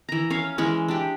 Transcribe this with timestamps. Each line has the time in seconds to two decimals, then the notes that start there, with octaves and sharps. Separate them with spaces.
0.09 E3 A#5
0.30 C#4 C#5 F5
0.58 E3 G#3 C#4
0.88 D4 G4